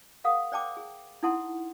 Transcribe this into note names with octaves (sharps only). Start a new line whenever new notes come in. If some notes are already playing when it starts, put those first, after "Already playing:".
G#4 A#4 F5 F#5 D#6
C5 D5 G5 A5 D6
G#4
D#4 E4 A4 F#5 A5 C6